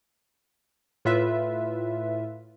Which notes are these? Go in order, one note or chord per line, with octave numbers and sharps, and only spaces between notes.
A2 F4 B4 E5